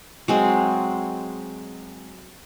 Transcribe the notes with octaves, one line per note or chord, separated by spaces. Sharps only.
F#3 G#3 C4